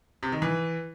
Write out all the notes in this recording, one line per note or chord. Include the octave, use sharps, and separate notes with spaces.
C3
D#3
E3